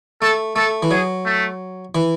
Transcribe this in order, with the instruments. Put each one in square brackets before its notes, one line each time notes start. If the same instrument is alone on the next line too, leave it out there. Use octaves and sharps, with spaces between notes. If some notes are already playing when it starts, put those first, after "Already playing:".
[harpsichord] A3 [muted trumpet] A4
[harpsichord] A3 [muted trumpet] A4
[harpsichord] E3
[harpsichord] F#3 [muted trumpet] G#4
[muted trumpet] A3
[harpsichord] E3